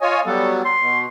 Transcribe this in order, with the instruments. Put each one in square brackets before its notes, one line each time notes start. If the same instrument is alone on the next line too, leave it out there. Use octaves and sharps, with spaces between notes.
[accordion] F4 C#5 G#5 [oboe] D#5
[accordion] F#3 G3 B3 [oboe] A4
[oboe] C6
[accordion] B2